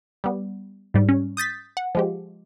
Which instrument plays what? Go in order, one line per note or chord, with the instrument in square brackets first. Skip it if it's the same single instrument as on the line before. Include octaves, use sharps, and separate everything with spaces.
[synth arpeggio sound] G3 B3
G#2 G3
C#4
D#6 G6 A6 B6
F#5
F3 G#3 G4